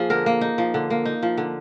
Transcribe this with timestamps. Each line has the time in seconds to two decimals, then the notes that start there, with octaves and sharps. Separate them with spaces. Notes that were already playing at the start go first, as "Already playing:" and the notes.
Already playing: F3 A#3 G#4
0.10 D3 A#4
0.26 A#3
0.41 D#4
0.58 F3
0.74 D3
0.90 A#3
1.05 D#4
1.23 F3
1.38 D3